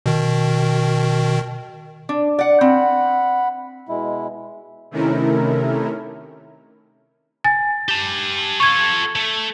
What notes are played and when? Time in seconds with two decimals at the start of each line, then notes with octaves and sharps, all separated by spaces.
0.06 B2 D#3
2.09 D4
2.39 D5 F#5
2.61 C4 F#5 B5
3.89 B2 G#3 E4
4.91 C3 D#3 A3 C#4 E4 A#4
7.44 G#5 A6
7.89 G4 A5
8.60 F4 A4 C#6 G#6
9.16 A3